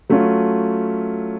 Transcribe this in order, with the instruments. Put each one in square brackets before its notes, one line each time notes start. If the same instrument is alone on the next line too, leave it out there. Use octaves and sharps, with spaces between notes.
[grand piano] F#3 A3 C#4 F4